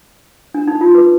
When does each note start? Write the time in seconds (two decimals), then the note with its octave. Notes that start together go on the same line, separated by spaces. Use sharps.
0.54 D4
0.67 D#4
0.81 F4
0.95 B4